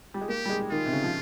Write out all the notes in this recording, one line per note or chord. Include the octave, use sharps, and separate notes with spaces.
G3
G#3
A#3 G4
G3
G#3
D#3 F4
C3
C#3
F3